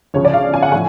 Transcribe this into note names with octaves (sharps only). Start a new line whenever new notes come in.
D2 C#3 F3 C#5
D5
F5
G#5
F#5
A2 F3 G#5